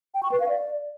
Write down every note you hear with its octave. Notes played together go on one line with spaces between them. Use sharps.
G5
C#6
B4
F5
D5